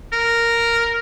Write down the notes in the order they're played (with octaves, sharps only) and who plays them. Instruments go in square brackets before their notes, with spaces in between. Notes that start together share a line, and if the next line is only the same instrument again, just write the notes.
[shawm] A#4